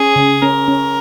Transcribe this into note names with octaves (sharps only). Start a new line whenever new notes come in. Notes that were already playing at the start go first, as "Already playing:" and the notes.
Already playing: C#4 G#4
C#3
C#4 A#4
C#4